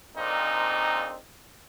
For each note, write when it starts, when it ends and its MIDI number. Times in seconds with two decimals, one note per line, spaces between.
0.16 1.16 34
0.16 1.16 41
0.16 1.16 46
0.16 1.16 60
0.16 1.16 63